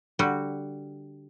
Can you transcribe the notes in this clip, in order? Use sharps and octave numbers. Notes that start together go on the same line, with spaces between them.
D3 G3 F#4